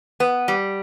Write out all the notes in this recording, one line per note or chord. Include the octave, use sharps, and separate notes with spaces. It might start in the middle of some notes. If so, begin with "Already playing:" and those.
B3
G3